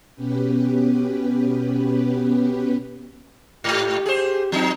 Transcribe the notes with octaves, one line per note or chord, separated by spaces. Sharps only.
B2 B3 C#4 G4 B4
G#2 G4
G#4 C5
F3 C4 D#4